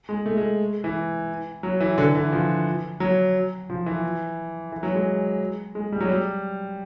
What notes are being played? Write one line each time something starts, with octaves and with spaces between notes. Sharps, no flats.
G#3
A3
G#3
E3
F#3
E3
D3
E3
F3
F#3
F3
E3
E3
F#3
G#3
G#3
G3
F#3
G3